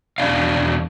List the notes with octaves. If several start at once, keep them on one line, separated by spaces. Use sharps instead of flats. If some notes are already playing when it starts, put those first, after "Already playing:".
E2 B2 D4 F5